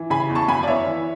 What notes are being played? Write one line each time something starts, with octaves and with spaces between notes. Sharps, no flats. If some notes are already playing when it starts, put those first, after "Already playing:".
Already playing: E3
C#3 G#5 B5
E2
A5 C#6
F#2 G#5 B5
D5
B3 C#5 E5
E3